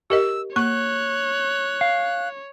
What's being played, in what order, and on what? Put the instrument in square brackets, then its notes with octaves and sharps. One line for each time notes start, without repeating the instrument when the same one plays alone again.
[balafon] G4 A#4 D#5 [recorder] E6
[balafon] A#3 C#6 [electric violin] C#5 [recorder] F#6
[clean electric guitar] F5